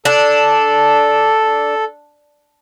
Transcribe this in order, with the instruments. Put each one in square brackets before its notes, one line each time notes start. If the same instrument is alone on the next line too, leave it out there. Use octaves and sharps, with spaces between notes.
[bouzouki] D4 [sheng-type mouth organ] A4